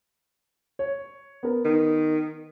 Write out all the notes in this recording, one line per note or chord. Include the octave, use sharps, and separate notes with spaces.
C#5
B3 A#4
D#3